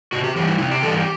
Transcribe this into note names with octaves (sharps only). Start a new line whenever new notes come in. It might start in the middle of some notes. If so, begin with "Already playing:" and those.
C3 F#4
G4
E3 G3 G4
E4
C3 E4
G4
E3 G3 A4
G4